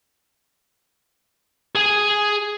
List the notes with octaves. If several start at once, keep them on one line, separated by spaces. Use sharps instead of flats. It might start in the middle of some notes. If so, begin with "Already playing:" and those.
G#4 G#5